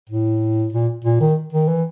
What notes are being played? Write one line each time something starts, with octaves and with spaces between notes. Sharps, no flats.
A2
A#2
A#2
D#3
D#3
E3